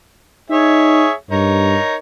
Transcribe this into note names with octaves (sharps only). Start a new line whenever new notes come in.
D#4 G#4 C#5 E5
G2 D#4 A#4 C#5